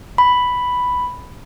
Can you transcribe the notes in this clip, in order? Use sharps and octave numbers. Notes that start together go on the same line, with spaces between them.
B5